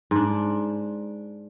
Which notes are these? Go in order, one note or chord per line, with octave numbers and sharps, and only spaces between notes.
G#2 D4